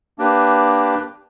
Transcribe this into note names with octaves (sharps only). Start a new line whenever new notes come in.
A#3 D4 G4 B4